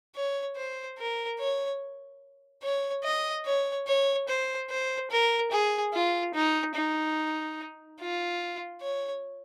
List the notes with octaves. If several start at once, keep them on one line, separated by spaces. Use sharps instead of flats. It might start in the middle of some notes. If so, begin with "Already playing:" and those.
C#5
C5
A#4
C#5
C#5
D#5
C#5
C#5
C5
C5
A#4
G#4
F4
D#4
D#4
F4
C#5